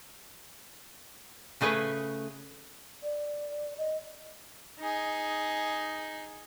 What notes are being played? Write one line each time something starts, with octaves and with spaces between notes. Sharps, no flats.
C#3 A3 G#4 B4
D5
D#5
D#4 G#4